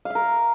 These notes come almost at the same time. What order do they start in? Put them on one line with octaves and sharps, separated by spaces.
F5 E5 A#4